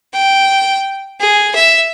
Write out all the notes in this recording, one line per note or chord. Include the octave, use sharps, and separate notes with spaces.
G5
G#4
E5